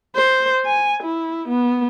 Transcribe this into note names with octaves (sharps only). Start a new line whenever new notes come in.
C5
G#5
E4
B3